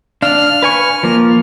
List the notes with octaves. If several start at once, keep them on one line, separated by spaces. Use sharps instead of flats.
D4 F5 F6
B4 G#5 C#6
F3 A#3